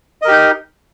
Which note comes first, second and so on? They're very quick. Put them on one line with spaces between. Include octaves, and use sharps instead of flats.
D#5 A#4 G4 D#4